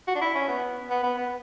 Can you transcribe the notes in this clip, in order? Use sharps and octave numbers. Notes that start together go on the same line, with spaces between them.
F#4
D4
E4
C#4
B3
B3
B3
B3